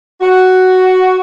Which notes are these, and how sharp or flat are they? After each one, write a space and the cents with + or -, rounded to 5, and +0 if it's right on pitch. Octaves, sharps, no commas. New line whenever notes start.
F#4 +5